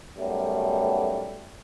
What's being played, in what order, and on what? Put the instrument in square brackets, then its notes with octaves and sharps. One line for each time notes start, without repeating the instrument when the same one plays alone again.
[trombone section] B1 F#2 G3 A3